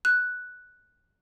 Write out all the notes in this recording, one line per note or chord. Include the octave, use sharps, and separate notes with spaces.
F#6